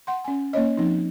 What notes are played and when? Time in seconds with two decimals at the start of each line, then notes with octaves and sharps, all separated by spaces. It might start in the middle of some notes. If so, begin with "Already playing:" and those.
0.07 F#5 C6
0.24 C#4 G#5
0.53 A#3 C#4 C#5 D#5
0.77 F3 C4 D#4